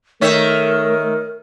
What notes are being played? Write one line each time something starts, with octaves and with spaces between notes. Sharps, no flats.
D#3 A3 A#4 C#5 E5